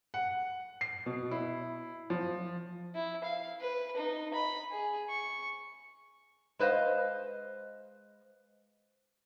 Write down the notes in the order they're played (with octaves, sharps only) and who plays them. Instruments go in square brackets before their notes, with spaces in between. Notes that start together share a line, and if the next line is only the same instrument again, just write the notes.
[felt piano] F#5
C7
B2
E4
F3
[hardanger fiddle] E4
F5
B4
D#4
B5
G#4
C#6
[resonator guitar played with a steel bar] G#3 B4 C5 D#5 F5